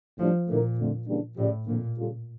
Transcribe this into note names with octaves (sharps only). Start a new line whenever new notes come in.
A2 F3 G3 D4
A#2 D3 A3 E4 A#4
F2 D3 A3
C#3 E3 G3 A#3 D4
A2 C#3 F3 C#4 G4 D5
F2 A#2 D3 F3 A#3
C#3 G3 C#4 F4 A4